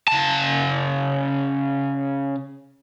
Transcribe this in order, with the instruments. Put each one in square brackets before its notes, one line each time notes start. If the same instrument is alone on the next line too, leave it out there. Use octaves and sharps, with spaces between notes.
[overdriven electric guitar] C#3 A5